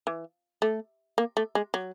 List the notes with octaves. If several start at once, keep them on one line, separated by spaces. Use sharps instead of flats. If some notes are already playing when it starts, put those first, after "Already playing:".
E3
A3
A#3
A3
G#3
F#3